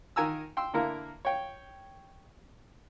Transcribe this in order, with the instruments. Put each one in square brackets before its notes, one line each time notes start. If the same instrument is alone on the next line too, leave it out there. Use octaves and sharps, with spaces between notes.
[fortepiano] D#3 A#4 G#5 A#5 E6
G5 C6 E6
D3 A#3 E4 A#4
C#5 G5